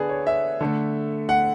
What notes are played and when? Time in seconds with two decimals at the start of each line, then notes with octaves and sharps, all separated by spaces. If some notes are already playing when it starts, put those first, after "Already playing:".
Already playing: D3 B3 G#4 A4 B4 D5
0.09 C#5
0.27 E5
0.61 D3 A3
1.29 F#5